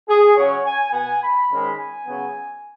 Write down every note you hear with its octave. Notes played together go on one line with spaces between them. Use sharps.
G#4
C#3 F#3 C#4 C#5
G#5
B2 B3 G#5
B5
G#2 D#3 G#3 C#4
G#5
C#3 F#3 B3